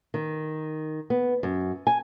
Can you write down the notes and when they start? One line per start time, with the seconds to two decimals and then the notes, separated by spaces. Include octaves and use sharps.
0.14 D#3
1.10 B3
1.43 F#2
1.87 G#5